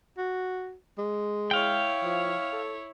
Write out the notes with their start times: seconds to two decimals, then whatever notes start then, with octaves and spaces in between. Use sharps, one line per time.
0.18 F#4
0.98 G#3
1.51 E4 C#5 F5 G5
2.03 F3
2.53 A4